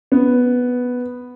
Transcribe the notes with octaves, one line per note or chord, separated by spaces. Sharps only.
B3